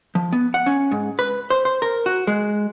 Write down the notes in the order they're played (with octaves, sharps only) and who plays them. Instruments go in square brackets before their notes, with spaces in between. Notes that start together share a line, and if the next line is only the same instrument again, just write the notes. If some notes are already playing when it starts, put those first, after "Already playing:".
[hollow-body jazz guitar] F3
B3
F#5
C#4
G#2
B4
C5
C5
A#4
F#4
G#3